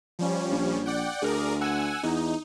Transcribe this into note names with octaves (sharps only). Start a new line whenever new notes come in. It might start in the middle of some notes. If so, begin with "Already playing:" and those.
F3 G3 C#4
A#1
D5 F#5 G5
D2 G#4 A#4 D5
F#5 G#5 E6
E2 D#4